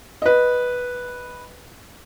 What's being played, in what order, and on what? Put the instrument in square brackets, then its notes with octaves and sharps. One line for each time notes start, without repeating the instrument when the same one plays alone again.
[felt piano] B4 D#5